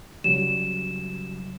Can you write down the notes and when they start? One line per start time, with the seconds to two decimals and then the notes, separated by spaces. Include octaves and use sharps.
0.24 C#3 F#3 G3 E7